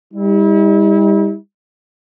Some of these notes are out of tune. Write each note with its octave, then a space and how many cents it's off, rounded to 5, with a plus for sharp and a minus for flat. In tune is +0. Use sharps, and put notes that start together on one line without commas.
G3 +30 E4 -40